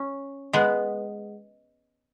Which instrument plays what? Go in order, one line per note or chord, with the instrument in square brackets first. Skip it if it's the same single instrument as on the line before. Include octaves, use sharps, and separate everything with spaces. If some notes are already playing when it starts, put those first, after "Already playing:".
Already playing: [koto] C#4
G#3 B3